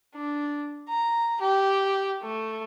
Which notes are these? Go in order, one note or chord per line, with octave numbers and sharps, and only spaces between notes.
D4
A#5
G4
A3